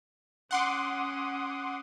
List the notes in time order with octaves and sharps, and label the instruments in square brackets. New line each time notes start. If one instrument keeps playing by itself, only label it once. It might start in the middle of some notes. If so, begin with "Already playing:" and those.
[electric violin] C#4 D#6 [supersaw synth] F#5 C6 D6